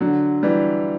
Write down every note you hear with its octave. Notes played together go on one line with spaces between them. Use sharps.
D3 F#3
E3 G3